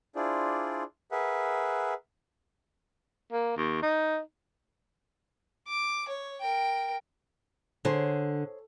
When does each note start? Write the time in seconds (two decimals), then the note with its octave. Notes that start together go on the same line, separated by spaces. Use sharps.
0.16 D4 E4 F4 G#4 C5 D5
1.12 G#4 A#4 B4 E5 F#5
3.32 A#3
3.57 D#2
3.82 D#4
5.68 D6
6.09 C#5
6.41 A#4 G5
7.85 D3 G#4 C5 C#5